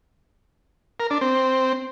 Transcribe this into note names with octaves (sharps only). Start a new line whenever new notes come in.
A#4
D4
C4